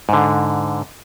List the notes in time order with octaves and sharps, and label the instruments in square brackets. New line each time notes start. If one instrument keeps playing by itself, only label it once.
[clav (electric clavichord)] G#2 D3